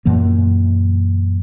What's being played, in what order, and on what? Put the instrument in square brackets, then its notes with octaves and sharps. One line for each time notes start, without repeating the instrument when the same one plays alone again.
[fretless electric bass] F#2 A#2 E3 A#3